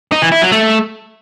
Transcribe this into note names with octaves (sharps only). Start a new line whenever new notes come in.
D#4
E3
E4
F#3
A3